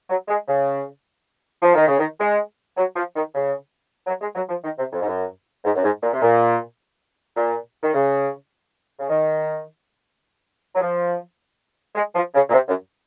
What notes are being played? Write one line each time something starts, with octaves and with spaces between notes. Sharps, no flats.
F#3
G#3
C#3
F3
D#3
C#3
D#3
G#3
F#3
F3
D#3
C#3
F#3
G#3
F#3
F3
D#3
C3
F2
G#2
F#2
G#2
F#2
G#2
A#2
C3
A#2
A#2
D#3
C#3
C#3
D#3
F#3
F3
G#3
F3
C#3
A#2
C3
F#2